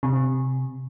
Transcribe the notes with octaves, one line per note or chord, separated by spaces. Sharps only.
C3